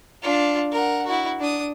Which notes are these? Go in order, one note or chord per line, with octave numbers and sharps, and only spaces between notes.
D4 F4
A#4 F#5
E4 F#4
D4 D#6